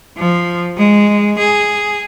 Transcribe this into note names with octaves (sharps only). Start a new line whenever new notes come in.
F3
G#3
G#4